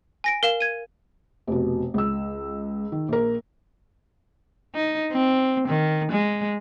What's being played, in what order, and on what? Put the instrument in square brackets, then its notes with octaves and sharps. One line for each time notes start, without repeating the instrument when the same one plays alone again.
[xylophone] G#5 A#6 D7
A#4 F5 E7
G#6 D#7
[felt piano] F1 B2
C#2 E6
D#3
A#1 A#4
[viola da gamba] D#4
C4
D#3
G#3